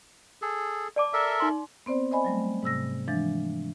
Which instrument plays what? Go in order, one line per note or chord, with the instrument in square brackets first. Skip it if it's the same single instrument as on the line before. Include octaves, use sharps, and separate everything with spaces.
[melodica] G#4 A4
[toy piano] D5 A5 D6
[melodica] A4 A#4 E5
[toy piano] D#4 C6
[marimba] B3 C4 C5 D5
C5 D5 D#5 G#5 B5
F#3 G3 A3
G#2 C3 E6 A#6
E3 F3 G#3 D4 A6